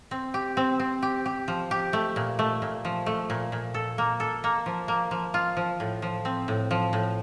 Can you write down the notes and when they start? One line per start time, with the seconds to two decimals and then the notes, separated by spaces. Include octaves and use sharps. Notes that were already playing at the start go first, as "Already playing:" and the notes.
0.11 C4
0.34 G4
0.57 C4
0.80 C4
1.02 G4
1.26 G4
1.48 F3
1.71 G4
1.93 A3
2.16 A#2
2.39 A3
2.62 A#2
2.85 F3
3.06 A3
3.30 A#2
3.52 A#2
3.74 A4
3.98 A#3
4.20 A4
4.44 A#3
4.66 F3
4.88 A#3
5.11 F3
5.34 F4
5.57 F3
5.80 A2
6.02 F3
6.25 C4
6.48 A2
6.71 F3
6.93 A2